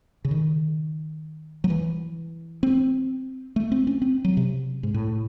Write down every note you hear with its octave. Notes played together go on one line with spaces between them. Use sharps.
C#3
D#3
F#3
E3
C4
A3
C4
C#4
C4
F#3
C3
G#2
A2